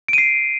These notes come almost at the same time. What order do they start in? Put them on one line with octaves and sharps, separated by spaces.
D7 D#7 C7